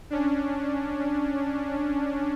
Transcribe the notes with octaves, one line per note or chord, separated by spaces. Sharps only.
C#4 D4